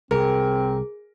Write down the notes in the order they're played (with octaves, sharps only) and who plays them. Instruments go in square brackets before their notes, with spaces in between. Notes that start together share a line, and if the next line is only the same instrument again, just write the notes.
[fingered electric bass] C2 C3 [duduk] C4 [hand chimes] G#4 [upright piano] A#4